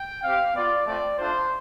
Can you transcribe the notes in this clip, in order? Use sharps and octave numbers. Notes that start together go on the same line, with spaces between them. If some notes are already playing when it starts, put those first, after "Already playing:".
Already playing: G5
C4 G4 F5
B3 F4 D5
A3 C4 F4 D5
A3 D4 F4 C5